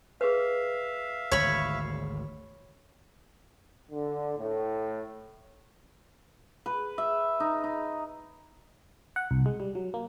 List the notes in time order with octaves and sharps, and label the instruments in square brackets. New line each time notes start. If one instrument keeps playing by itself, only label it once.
[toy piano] G#4 B4 [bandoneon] E5 F5
[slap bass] G#1 D2 [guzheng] C#5 B5
[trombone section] D3
A2
[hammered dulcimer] B4
E5
D#4
D#4
[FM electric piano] F#5
C2
G#3
G3
F#3
A#3